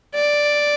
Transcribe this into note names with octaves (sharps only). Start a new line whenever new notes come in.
D5